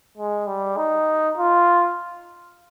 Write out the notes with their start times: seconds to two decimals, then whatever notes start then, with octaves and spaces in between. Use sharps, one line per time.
0.17 G#3
0.47 G3
0.77 D#4
1.37 F4